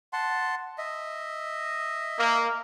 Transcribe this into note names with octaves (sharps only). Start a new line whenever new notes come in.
F#5 A5 C6
D#5 E5
A#3